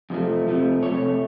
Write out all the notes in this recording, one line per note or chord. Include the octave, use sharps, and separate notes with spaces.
F2 C3 F3 A3
F2 C3 F3 A3
F2 C3 A3 C#5